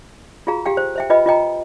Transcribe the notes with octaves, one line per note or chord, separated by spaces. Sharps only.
F4 F#4 G#4 F5 A#5
G4 F5 G5
C5
C5 E5 G5
F4 B4 D#5 G5 B5
F4 D#5 G5 A#5